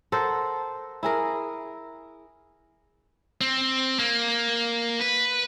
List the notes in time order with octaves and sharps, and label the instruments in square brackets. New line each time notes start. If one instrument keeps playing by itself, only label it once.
[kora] A4 A#4 C5 F#5
E4 G#4 A#4
[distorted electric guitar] C4
A#3
B4